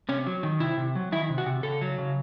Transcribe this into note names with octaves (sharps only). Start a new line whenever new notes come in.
C3 C#4
F#3
D#3
C3 E4
C3
F#3
D#3 E4
C3
F#4
C3
C#3 A4
F#3
C#3